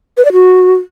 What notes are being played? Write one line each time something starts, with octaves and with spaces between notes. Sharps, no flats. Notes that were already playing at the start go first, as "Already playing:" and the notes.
B4
D5
F#4